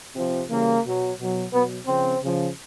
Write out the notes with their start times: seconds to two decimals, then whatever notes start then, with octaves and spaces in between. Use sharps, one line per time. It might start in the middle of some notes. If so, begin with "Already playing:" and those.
0.15 C3 F3
0.49 C#3 E3 G3 A#3
0.84 B2 F#3
1.18 B2
1.23 F#3
1.52 B2 F#3 B3
1.87 C#3 F3 C4
2.22 C#3 F3